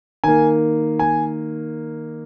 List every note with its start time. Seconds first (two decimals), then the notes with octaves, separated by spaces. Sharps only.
0.24 D#3 A#3 G#5
0.99 G#5